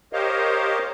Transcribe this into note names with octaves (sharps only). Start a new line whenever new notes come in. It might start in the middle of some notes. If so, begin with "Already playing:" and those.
G4 A#4 C5 C#5 D#5 F5